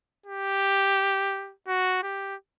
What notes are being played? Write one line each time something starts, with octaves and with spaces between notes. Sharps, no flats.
G4
F#4
G4